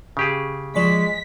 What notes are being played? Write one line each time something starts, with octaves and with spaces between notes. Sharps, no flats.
C#3 G4 G#4
F3 G#3 D5 C#6 B6